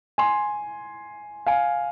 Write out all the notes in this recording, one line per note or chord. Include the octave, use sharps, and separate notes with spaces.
G#5 C6
F5 G#5